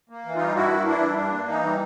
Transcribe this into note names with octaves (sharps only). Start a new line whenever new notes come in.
A#3
E3
G3 D#4 F4
G2 E4 F#4
A#3
E3 D4 E4
G3
G2 D4
A#3
E3 D#4
G3